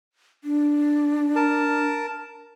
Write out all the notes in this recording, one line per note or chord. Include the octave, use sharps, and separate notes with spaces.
D4
A#4 A5